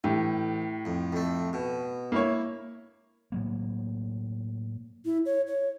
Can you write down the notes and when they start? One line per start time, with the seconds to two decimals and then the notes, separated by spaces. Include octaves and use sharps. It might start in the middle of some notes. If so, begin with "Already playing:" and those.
0.04 A1 A2 G4
0.85 F2
1.12 F2 A3
1.53 B2
2.12 A#3 E4 C#5
3.32 A2 F#3 A#3
5.05 E4
5.26 C#5
5.47 C#5